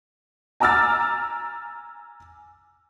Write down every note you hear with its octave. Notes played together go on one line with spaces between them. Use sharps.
G#5 A#5 D6 E6 F6 A6